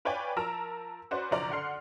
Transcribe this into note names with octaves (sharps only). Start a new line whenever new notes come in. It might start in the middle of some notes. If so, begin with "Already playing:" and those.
F4 B4 C#5 D5 G5 G#5
F3 A#4 A5 A#5 E6
C#4 F#4 B4 C5 D5
F#1 B1 F3 D4 D5 A#5
D3 D4 F#5 C6 F6 C7